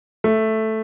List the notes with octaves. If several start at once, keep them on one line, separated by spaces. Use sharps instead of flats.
A3